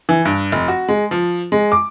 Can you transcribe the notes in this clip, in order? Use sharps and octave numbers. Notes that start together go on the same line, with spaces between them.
E3
G2
F1
F#4
G#3
F3
G#3
D6